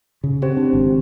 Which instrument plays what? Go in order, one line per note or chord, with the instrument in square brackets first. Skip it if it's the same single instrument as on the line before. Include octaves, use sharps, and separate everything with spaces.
[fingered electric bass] C#3
[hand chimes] C4 G4 C5
[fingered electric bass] D4
G#1